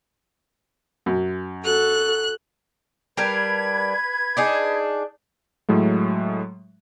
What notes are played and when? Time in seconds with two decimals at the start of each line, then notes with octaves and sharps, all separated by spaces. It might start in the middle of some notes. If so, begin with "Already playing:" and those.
1.06 F#2
1.64 F#4 A4 F#6
3.17 G3 D4 A#4 B4 G#6
4.37 D4 D#4 G#4
5.69 A2 F#3 G#3 A3